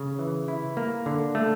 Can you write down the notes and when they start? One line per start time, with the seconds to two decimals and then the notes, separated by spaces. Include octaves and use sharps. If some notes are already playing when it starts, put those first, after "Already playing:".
Already playing: C#3
0.19 E3
0.48 E4
0.77 A#3
1.06 D3
1.35 A3